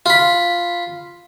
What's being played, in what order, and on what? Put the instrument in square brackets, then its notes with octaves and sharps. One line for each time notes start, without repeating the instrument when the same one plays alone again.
[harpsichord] F4 B5